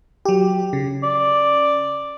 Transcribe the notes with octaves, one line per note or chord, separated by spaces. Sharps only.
F#3 G4
C#3
D5